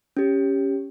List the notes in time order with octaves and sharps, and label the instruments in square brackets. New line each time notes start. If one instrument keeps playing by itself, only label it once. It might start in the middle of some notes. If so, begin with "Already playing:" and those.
[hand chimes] C#4 G4